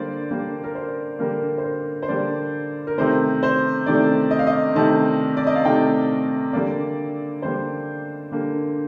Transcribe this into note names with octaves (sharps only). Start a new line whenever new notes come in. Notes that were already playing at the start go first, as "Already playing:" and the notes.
Already playing: D3 G3 A#3 C5 D5
D3 G3 A#3
A#4
C5
D3 G3 A#3 A#4
C5
A#4
C5
D3 G3 A#3 D5
A#4
C3 D#3 A3 C5
C5
C3 D#3 A3 D5
D#5
F5
D#5
C3 D#3 A3 A5
D5
D#5
F5
C3 D#3 A3 G5
D3 G3 A#3 D5
D3 G3 A#3 C5
D3 G3 A#3